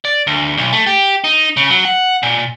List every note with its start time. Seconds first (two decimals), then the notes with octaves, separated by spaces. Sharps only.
0.05 D5
0.27 D2
0.57 B1
0.73 A3
0.87 G4
1.24 D#4
1.57 C#3
1.70 F#3
1.85 F#5
2.23 A#2